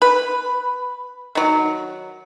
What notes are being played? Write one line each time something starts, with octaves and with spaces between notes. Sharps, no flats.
B4
D#3 F#3